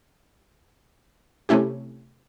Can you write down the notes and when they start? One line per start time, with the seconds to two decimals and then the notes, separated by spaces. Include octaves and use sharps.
1.49 C3 A3 C#4 E4 G4